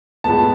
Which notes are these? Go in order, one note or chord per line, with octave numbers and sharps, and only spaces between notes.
A2 G#3 B3 A5